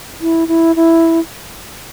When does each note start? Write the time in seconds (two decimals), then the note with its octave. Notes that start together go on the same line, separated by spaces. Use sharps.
0.21 E4
0.48 E4
0.76 E4